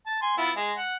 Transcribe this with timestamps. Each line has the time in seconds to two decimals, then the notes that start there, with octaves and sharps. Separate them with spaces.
0.06 A5
0.22 G#5 C6
0.38 B3 E4 F4
0.56 G#3
0.77 F#5